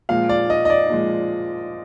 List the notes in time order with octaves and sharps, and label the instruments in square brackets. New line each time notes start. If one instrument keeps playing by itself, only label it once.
[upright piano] A#2 F3 G#3 F5
D5
D#5
D#5
D5
A#2 F3 G#3